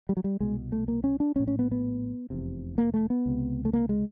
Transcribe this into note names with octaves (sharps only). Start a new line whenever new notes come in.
G3
F#3
G3
C2 B2 G#3
A3
A#3
C#4
D4
A#1 A2 C#4
C#4
B3
B3
F1 E2 C3
A#3
A3
B3
C#2 C3
A3
A#3
G#3